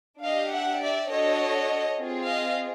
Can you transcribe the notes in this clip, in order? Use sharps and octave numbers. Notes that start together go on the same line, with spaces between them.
D4 G4 D#5 F5
E5 F#5
D5 E5
D4 F#4 A4 C#5 D#5
C4 F4 G#4
D#5 F5